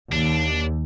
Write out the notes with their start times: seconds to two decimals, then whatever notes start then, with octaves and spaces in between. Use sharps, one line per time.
0.13 D#2 D4